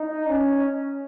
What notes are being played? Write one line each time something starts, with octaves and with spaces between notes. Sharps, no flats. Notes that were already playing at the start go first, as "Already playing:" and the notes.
Already playing: D#4
C#4